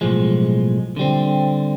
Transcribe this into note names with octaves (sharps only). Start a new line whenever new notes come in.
B1 A2 F3 G#3
D3 G3 C4